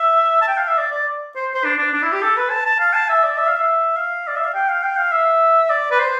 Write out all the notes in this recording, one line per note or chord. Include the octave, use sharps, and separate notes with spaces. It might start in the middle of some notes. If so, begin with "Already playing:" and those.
Already playing: E5
A5
G5
F5
E5
D5
D5
C5
C5
D4
D4
D4
E4
G4
A4
B4
A5
A5
F5
A5
E5
D5
E5
F5
E5
F5
D5
E5
F5
G5
F5
G5
F5
E5
D5
B4
C5